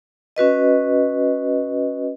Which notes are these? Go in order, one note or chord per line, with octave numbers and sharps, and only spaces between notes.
C#4 F#4 B4 D#5